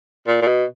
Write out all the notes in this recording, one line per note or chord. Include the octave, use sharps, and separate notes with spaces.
A#2
A#2
B2